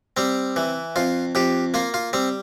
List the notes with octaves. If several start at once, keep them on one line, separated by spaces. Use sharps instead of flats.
G3 C4
E3
F2 F4
F2 G4
A#3 F4
F4
G3 C4